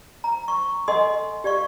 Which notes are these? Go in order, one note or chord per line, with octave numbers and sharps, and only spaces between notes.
A#5
C#6
A4 D#5 F#5 G#5 C6 D#6
G4 D5 F5 C#6